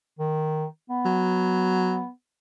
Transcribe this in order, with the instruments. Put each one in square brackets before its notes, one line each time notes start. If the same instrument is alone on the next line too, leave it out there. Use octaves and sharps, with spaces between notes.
[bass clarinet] D#3
B3
[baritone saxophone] F#3